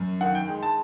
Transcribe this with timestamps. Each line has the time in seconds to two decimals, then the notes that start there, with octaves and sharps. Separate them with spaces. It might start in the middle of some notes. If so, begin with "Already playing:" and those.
Already playing: F#2
0.21 D#3 F#5
0.35 G5
0.48 G#3
0.63 A5